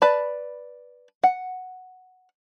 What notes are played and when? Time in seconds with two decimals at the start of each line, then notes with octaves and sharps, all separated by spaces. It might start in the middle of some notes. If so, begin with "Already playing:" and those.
0.02 B4 D5 A5 B5
1.24 F#5